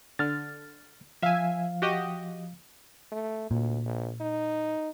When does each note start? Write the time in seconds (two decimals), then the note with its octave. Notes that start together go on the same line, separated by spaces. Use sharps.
0.19 D3 F6 A6
1.22 F3 E5 F5 G#5
1.82 F#4 G4 D#5
3.12 A3
3.51 D2 A#2
3.85 A#1
4.21 D#4